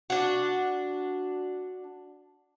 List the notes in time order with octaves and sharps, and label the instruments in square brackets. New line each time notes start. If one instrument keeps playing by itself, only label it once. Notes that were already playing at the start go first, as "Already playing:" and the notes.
[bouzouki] D4 F#4